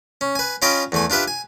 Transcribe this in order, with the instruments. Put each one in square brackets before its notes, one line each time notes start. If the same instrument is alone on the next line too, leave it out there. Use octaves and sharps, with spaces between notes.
[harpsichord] C#4
B4 G#5
C#4 F4 D5 D#5 G5 B5
E2 A3 G#5
D4 F4 G4 B4 E5
G#5